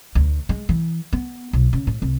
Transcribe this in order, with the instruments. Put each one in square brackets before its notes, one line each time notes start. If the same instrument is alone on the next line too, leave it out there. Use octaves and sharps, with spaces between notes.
[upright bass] D2
G#3
E3
B3
B1
C#3
A2
C2